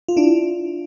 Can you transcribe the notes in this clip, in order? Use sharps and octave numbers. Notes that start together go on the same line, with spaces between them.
F4
D4 E4